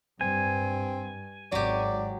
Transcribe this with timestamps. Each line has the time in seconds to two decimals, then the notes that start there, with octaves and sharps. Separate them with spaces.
0.21 G2 C4 G#5
1.52 G#1 F#3 G4 D5